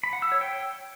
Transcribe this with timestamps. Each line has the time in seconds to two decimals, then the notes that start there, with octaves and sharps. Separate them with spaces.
0.04 B5
0.13 F#5
0.22 E6
0.32 C#5
0.41 G5